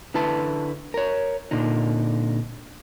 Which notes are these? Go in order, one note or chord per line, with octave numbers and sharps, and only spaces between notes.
D3 E4 B4 A5
A#4 C#5
A#2 D3 D#4